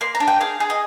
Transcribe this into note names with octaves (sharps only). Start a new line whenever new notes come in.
A#3 C6
A#5
D4
G5
G#4 F5
G#4
D#5